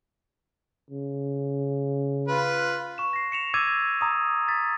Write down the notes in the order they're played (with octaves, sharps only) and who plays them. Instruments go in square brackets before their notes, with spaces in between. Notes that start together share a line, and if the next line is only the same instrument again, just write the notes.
[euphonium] C#3
[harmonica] F4 B4
[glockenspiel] C#6 E7
A#6 C7
C#7 E7 F7
D6 E6 G#6 A6 D#7
A#5 D#6
A6 B6